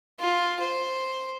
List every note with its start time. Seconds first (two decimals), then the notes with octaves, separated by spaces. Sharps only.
0.20 F4
0.60 C5